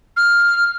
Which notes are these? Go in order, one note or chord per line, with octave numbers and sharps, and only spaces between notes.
F6